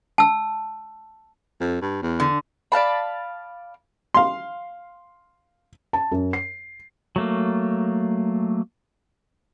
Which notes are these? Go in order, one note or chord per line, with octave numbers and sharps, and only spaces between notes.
A5 E6
F2
G2
E2
D3
D5 F5 A5 B5
F5 C6
A5
F#2
C7
F#3 A3 A#3